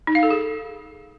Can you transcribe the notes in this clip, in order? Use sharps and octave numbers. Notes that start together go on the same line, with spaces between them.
D#4
F5
A4
G#4